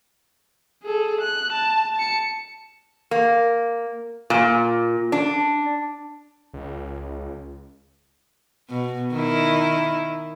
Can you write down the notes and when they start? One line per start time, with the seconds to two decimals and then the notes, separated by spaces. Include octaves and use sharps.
0.84 G#4 A4
1.21 F#6
1.52 A5
1.95 A5 C#7
3.11 A#3
4.30 A#2
5.12 D4
6.54 C#2
8.69 B2
9.12 D#3 E4